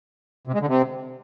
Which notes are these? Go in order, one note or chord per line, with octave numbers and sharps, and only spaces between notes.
C3
G#3
D3
C3